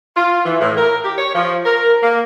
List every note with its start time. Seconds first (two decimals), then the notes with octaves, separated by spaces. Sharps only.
0.17 F4
0.45 E3
0.61 A2
0.77 A#4
1.05 G4
1.18 C#5
1.35 F3
1.66 A#4
2.03 A#3